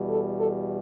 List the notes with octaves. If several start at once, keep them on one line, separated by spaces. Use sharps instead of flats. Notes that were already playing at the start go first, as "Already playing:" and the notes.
Already playing: E2 B2 G3
A4
A4